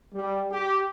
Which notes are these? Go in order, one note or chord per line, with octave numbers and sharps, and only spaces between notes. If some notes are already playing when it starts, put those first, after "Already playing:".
G3
G4